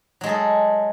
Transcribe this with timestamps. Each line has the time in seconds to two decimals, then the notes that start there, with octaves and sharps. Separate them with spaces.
0.21 F#3
0.24 G#3
0.26 A4
0.29 G#4